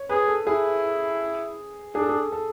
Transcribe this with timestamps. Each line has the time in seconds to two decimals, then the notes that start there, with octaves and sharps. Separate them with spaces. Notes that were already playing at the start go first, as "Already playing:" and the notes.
Already playing: C#5
0.09 G#4 B4
0.28 A4
0.47 E4 G#4
1.95 D4 G#4
2.01 A4
2.09 G#4
2.32 A4